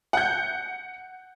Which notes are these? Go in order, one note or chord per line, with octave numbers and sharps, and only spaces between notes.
F#5 G6